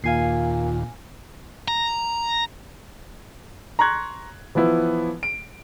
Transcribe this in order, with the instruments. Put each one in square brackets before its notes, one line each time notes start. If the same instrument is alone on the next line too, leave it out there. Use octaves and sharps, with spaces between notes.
[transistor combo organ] D#2 [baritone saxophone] A#2 [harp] F5 G#5 C7
[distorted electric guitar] A#5
[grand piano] A#5 C6 C#6 F#6 G#6
E3 F3 B3 E4
D7